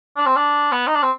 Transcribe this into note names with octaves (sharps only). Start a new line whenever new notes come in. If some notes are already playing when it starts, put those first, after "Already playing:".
D4
C4
D4
B3
D#4
D4
C4